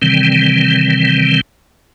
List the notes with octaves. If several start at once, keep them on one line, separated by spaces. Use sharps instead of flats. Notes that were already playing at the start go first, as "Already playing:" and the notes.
C3 D#3 E3 G3 C4